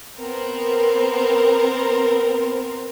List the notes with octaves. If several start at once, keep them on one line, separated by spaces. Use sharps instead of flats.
B3 C4 A#4